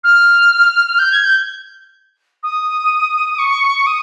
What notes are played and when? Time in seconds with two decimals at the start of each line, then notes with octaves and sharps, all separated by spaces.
0.04 F6
0.99 G6
1.11 G#6
1.23 G6
2.43 D#6
3.38 C#6
3.86 D#6